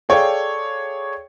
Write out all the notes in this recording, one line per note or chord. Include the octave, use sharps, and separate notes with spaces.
G#4 A4 C#5 D5 F5 G5